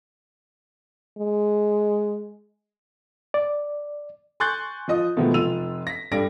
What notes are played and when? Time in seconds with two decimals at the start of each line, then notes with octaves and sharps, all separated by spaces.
1.19 G#3
3.34 D5
4.40 G#5 C6 C#6 F#6 G6 A6
4.88 F3 F4 D#5 D#6
5.17 B2 D#3 F3 G#3 A3 B3
5.34 F1 F4 E6 D#7 F7
5.87 A#6 B6
6.12 G2 G3 A4 A#6 D7